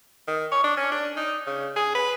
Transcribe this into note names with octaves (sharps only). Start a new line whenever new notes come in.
D#3
C#5
D4
C#4
D4
D#4
C#3
G#4
B4